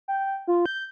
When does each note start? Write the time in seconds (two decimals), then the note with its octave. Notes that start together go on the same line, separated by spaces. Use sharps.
0.08 G5
0.48 F4
0.66 G6